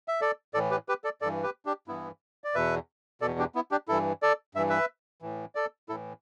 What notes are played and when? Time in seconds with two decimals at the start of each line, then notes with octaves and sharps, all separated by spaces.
0.08 E5
0.21 A4 D5
0.54 A2 E3 A4 D5
0.71 G4 B4
0.89 G4 B4
1.04 A4 D5
1.21 G2 E3 A4 D5
1.43 G4 B4
1.65 D4 G4
1.88 G2 E3 B3 E4
2.44 D5
2.55 E2 B2 B4 E5
3.21 B2 A4 D5
3.25 E2
3.39 D4 G4
3.55 B3 E4
3.71 D4 G4
3.88 G2 E3 E4 A4
4.22 A4 D5
4.55 G2 E3 E5
4.70 B4 E5
5.22 A2 E3
5.55 A4 D5
5.89 A2 E3 E4 A4